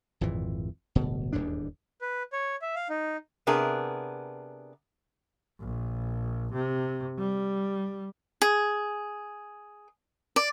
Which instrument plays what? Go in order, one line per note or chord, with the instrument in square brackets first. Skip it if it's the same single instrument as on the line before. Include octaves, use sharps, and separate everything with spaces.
[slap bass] G#1 F2 A#2 E3
D1 G1 B2
D#1 E2 G#2 D4
[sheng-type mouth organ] B4
C#5
E5
F5
D#4
[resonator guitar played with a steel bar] C3 B3 D4 G#4 A#4
[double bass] A#1
C3
G3
[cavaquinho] G#4
D5